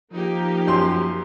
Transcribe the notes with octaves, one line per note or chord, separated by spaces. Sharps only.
F3 A#3 D#4 G4
F#2 C6